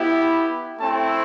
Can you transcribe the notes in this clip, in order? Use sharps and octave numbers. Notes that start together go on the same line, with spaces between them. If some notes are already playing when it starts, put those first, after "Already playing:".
Already playing: B3 E4 G4
A3 C4 E4 A5